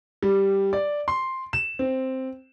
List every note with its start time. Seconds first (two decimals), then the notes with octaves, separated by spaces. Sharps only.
0.23 G3
0.73 D5
1.08 C6
1.53 E7
1.79 C4